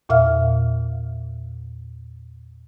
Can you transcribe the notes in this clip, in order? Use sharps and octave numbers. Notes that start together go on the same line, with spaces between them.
E2 A#2 E5 F5 F6